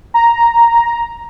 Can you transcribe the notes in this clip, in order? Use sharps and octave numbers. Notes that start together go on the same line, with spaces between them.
A#5